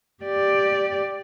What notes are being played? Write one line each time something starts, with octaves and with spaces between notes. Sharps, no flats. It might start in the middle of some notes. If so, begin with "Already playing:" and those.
G4 D5